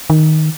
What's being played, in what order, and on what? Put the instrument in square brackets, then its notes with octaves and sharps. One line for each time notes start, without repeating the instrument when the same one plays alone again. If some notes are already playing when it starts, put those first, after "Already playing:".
[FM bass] D#3